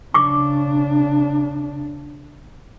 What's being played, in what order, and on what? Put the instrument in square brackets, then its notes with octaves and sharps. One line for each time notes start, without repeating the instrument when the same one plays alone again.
[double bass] C#3 D4 [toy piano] C#6 D6